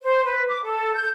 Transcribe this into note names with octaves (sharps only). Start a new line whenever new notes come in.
C5
B4
D6
A4
G6